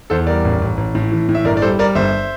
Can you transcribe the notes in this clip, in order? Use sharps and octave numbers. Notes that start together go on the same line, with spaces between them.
E2 A4 C5
G3 A#4 D5
A1
A1
A1
A2
E3
A2
E5
G1 A#4 D5
D5
G3 A4 C5
G3 A#4 D5
G1 C5 E5